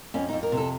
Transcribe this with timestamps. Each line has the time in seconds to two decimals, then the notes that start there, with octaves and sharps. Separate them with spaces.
0.14 F2 C#4
0.29 F2 D#4
0.43 A#4
0.52 C3
0.57 A4